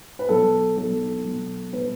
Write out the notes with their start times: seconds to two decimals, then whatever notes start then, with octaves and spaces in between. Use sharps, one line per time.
0.19 B4
0.29 B2 F#3 A4
0.77 B2 F#3 A4
1.25 B2 F#3
1.73 B2 F#3 B4